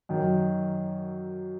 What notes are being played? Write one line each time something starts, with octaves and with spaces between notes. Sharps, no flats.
F#2 D#3 F#3